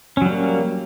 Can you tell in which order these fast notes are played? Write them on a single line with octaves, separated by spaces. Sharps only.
C#4 F#3 G3 A#3